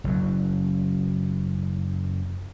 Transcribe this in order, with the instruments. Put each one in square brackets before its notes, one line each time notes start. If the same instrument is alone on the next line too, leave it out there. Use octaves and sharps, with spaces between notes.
[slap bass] F#1 F#2 F#3